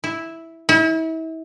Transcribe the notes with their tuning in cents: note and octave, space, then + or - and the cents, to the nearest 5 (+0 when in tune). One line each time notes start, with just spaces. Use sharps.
E4 -5
E4 -35